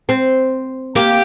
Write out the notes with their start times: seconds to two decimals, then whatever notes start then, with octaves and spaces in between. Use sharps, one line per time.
0.09 C4
0.96 A#3 G4